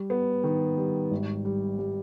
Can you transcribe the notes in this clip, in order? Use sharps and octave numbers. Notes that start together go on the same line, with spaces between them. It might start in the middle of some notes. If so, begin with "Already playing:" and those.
Already playing: G3
B3
D#3
G3
G#1
G3
G3